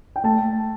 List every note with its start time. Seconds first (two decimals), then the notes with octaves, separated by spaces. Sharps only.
0.16 G5
0.24 A3 A5